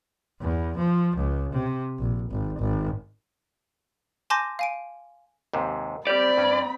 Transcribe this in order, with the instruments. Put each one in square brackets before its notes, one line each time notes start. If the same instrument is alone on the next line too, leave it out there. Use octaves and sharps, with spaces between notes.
[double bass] E2
F3
C#2
C3
A#1
G#1
G#1
[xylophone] G#5 A5 C6 D6 G6 A#6
F5 G#5 D7
[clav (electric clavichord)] D#2 G#2 C3
[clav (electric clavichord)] G3 G4 [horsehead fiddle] C4 B5 [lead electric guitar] D5
[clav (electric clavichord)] G2 C#4